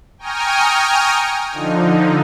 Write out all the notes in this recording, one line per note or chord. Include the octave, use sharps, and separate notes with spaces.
G5 G#5 A#5 C#6 D#6 F6
D3 F3 D#4